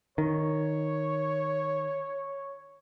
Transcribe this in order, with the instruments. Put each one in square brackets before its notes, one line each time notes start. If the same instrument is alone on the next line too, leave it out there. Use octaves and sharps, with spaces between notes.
[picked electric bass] D#3 [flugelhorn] C#5